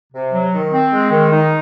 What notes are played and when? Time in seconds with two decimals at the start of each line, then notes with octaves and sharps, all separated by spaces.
0.13 C3
0.32 F#3
0.52 D#3
0.71 C4
0.91 G#3
1.10 D#3
1.30 D#4